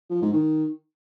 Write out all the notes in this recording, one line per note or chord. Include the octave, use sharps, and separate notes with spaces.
F3
G#2
D#3